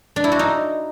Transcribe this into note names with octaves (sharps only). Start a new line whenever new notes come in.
D4
E4
F#4
D#4